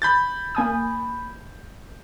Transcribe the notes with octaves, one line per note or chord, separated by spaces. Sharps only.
B5 G6 A6
A#3 G#5 D#6